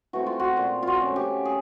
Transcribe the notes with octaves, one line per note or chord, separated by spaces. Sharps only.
E3 A3 C4 F#4
F4
F#4
A#2 F4
F4 F#4
F3 A3 C#4
G4
G#4